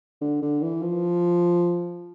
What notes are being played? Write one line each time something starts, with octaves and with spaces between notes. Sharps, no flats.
D3
D3
E3
F3